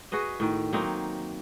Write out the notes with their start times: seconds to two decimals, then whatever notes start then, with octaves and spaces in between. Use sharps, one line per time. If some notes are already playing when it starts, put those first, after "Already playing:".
0.12 F#4 G#4 B4 D#5
0.40 A2 D#3
0.73 F#3 A#3 C4 D#4